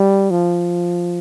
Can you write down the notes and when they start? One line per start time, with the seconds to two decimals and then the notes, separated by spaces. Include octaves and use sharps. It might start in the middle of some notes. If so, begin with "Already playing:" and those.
Already playing: G3
0.31 F3